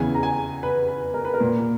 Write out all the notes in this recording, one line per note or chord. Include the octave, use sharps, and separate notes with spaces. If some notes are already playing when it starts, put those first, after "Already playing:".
Already playing: E2 C#3 E3 G#5
A#5
G#5
B4
B4
A#4
B4
A#4
A#2